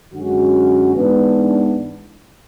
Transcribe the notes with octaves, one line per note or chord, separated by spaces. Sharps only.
F#2 D3 G#3 C#4 F#4
G#2 E3 B3 D4